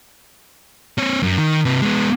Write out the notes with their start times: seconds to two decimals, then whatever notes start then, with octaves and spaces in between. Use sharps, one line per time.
0.98 C4 C#5
1.23 F#2
1.38 D#3
1.65 C3 B4
1.82 G#3 B3